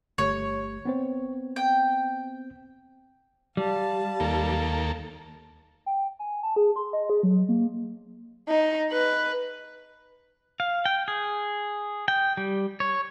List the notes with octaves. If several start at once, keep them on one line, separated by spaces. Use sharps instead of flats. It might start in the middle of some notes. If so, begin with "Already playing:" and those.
G1 A3 G4 C#5
B3 C4 C5
G5
G3 F5 A5
D#2 A#3 A4
G5
G#5
A5
G#4
C6
D#5
G#4
F#3
A#3
D#4
B4
F5
G5
G#4
G5
G3
C#5